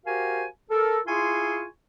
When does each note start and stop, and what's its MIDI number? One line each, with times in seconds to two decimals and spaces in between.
0.05 0.45 66
0.05 0.45 67
0.05 0.45 70
0.05 0.45 72
0.05 0.45 77
0.05 0.45 80
0.70 0.99 69
0.70 0.99 70
1.07 1.65 64
1.07 1.65 65
1.07 1.65 68
1.07 1.65 80
1.07 1.65 84
1.07 1.65 85